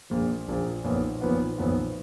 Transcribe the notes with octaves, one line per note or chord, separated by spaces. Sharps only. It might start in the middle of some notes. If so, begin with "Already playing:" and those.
A#1 A#2 F3
A#1 A#2 F3
B1 A#2 F3 B3
B1 A#2 F3 B3
B1 A#2 F3 B3